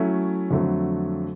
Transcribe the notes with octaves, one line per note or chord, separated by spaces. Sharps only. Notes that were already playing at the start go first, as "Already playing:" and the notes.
Already playing: F#3 A3 C#4 E4
F2 D3 F#3 A3